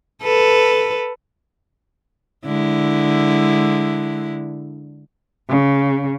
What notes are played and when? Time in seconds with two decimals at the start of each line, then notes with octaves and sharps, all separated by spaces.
0.22 A4 B4
2.45 D3 G#3 E4
5.49 C#3